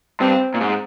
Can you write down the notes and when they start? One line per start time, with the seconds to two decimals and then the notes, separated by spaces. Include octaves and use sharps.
0.20 G2 C4
0.54 A#2
0.61 G#2